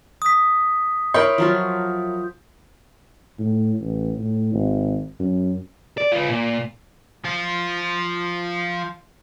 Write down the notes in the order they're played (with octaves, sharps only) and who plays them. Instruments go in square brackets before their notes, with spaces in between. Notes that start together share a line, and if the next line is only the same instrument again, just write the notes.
[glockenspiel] D#6 B6
[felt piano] E4 A#4 C#5 [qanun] G5 B5 C6 [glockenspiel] G6
[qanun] F3 F#3 F4
[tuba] A2
A1
A2
G#1
F#2
[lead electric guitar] D5
F4 B4
A#2
F3 F4